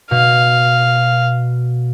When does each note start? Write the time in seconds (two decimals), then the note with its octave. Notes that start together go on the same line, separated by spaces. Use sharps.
0.11 B2 F5